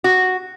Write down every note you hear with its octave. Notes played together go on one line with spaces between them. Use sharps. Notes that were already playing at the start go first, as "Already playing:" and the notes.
F#4